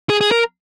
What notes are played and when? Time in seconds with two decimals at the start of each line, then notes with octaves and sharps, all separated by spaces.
0.10 G#4
0.21 G#4
0.32 A#4